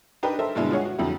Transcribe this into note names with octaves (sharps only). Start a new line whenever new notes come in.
D4 D#4 G4 A#4 B4
A4 A#4 C5 E5
G2 B2 D3 G#3 E4
F4 G#4 C#5 F#5
F#4
F2 D3 F#3 E4 G4